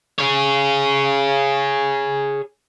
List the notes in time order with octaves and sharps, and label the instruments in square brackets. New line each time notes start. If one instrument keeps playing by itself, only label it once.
[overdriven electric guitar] G#4 C#5